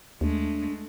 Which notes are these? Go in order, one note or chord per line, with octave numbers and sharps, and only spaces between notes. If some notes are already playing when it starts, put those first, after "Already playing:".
D#2 G#3 A3 D4